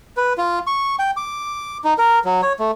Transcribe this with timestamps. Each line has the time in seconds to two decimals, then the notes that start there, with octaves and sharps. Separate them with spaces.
0.17 B4
0.38 F4
0.67 C#6
0.99 G5
1.17 D6
1.84 D#4
1.98 A#4
2.25 F#3
2.42 C#5
2.59 A3